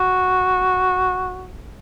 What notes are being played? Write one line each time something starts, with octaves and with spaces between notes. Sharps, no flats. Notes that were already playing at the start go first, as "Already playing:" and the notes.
Already playing: F#4